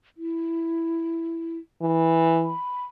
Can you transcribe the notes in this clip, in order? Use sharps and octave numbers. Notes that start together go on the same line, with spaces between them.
E4
E3
B5